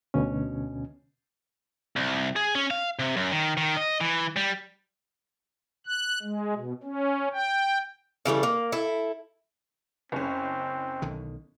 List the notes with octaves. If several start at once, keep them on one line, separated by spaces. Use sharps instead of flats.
D2 B2 C#4
C2
G#4
C#4
F5
C3
F#2
D#3
D#3
D#5
E3
G3
F#6
G#3
B2
C#4
G5
C#3 E3 G3 A3
A#3
E4 A4
F#1 C4 C#4
B1 D3 D#3